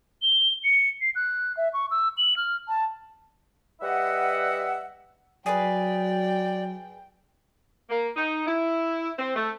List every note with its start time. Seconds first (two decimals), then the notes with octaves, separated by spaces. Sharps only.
0.22 G7
0.64 C#7
1.01 C7
1.15 F#6
1.57 E5
1.74 C#6
1.91 E6
2.18 F#7
2.37 F6
2.68 A5
3.82 G3 B4 D#5 E5 F#5
5.46 F#3 G#4 B4 D5 G5
7.90 A#3
8.16 D#4
8.47 E4
9.18 C4
9.35 A3